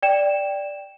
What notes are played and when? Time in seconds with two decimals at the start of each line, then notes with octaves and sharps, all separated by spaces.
0.02 D5 G5 E7